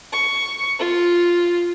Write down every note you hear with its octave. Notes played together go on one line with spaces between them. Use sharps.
C#6
F4